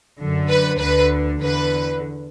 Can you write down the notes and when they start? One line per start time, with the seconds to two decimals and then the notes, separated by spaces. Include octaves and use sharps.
0.19 F#2 D3
0.49 B4
0.80 D2 D3 B4
1.42 E2 D3 B4